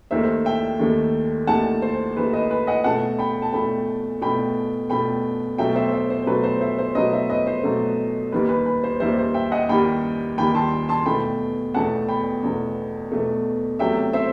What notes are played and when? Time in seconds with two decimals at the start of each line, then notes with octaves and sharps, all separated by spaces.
0.11 D#2 D#3 A3 C5 E5
0.45 E5 G5
0.79 D#2 D#3 A3
1.47 D#2 D#3 A3 F#5 A5
1.82 C5
2.17 D#2 D#3 A3 B4
2.33 B4 D#5
2.51 B4
2.67 D#5 F#5
2.84 B2 A3 F#5 A5
3.19 G5 B5
3.42 A5
3.53 B2 A3 G5 B5
4.21 B2 A3 G5 B5
4.90 B2 A3 G5 B5
5.58 B2 F#3 A3 E5 G5
5.76 C5 E5
5.93 C5 E5
6.10 C5
6.26 B2 F#3 A3 B4
6.44 C5
6.61 C5 E5
6.79 C5
6.95 B2 F#3 A3 B4 D#5
7.13 C5 E5
7.30 B4 D#5
7.47 C5
7.64 B2 F#3 A3
8.32 D#2 D#3 G3 B4
8.49 B4
8.66 B4
8.84 C5
9.00 D#2 D#3 G3 C5 E5
9.18 C5
9.34 E5 G5
9.52 D#5 F#5
9.69 D#2 D#3 G3 G5 B5
10.37 D#2 D#3 G3 G5 B5
10.55 A5 C6
10.89 A5 C6
11.06 E2 B2 A3 G5 B5
11.74 E2 B2 A3 F#5 A5
12.08 G5 B5
12.43 E2 B2 A3
13.12 E2 B2 A3
13.79 E2 C3 F#3 A3 E5 G5
14.13 C5 E5